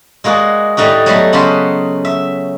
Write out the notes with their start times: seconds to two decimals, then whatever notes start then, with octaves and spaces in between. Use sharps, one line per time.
0.24 G#3 A#3 F#4 G#4 D5
0.77 A2 G3 A3 D#4 F#4
1.06 F#3 G3 A3 B3
1.33 C#3 B3 C#4 C5 A5 B5
2.05 E5